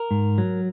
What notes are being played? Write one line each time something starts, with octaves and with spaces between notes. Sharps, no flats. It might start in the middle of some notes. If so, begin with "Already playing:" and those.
Already playing: A#4
G#2
F#3